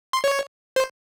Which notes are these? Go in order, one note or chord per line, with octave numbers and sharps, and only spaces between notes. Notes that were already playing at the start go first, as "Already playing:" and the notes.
C6
C#5
C5